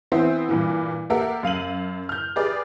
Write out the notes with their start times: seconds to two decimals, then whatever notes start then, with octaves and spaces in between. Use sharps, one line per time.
0.12 E3 B3 C4 E4 C5 E5
0.49 G2 A#2 E3
1.10 A#3 G4 A4 A#4 E5 F#5
1.43 F#2 F5 D#7 F#7
2.09 F6 G6
2.36 G4 G#4 B4 D5